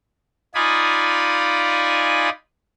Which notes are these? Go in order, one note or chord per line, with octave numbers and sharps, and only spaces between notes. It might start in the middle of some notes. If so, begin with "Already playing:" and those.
D#4 F4 D5 G#5 B5 D#6